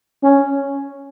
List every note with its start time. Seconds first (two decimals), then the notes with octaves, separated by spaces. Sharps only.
0.23 C#4